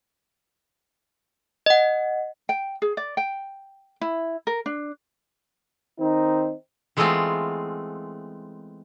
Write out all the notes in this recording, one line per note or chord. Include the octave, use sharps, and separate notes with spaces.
D#5 F#5
G5
G#4
D5
G5
E4
A#4
D4
D#3 C4 D#4
E3 G#3 A3 B3 C4 F4